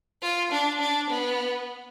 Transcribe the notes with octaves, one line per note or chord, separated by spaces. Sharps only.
F4
D4
D4
B3